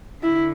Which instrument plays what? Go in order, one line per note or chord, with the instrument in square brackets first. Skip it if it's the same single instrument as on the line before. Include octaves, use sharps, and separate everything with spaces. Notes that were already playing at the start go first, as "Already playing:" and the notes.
[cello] D3 [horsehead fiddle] E4